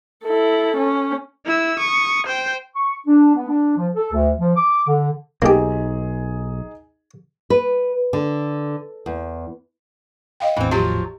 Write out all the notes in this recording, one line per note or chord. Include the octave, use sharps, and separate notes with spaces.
E4 A4
C#4
E4 E6
C#6 D#6
C5 G5
C#6
D4
B3
D4
F3
A4
D2
F3
D6
D3
B1 A#3 D#4 G4 G#4
B4
D3
E2
D#5 F5 G5
G#1 E2 A2 E3 C4
F3 F#3 G4 C6